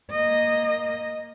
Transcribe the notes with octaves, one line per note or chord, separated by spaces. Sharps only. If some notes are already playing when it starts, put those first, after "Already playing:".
A#3 D#5